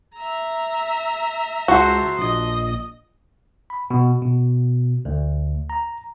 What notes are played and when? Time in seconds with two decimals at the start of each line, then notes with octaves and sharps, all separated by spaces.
0.16 E5 A#5
1.68 C#2 F#4 A4 C5
2.18 A#1 D#5
3.70 B5
3.91 B2
4.22 B2
5.05 D2
5.70 A#5